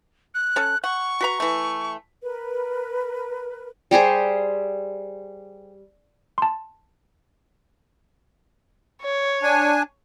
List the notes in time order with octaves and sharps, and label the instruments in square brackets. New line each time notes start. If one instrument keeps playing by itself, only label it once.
[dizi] F#6
[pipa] C#4 A4 C#5
[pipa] F#5 [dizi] C#6
[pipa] F#4 B4 A#5
E3 A3
[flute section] A#4 B4
[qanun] G3 G4 G#4 C5
[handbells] A5 C6
[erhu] C#5
[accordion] D4 G#5